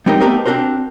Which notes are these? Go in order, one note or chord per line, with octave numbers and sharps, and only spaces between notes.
G3 C4 D#4 G4 A#4 D#5
A3 B3 G4 A#4 C5 D#5
C4 D4 D#4 F#4 A#4 C5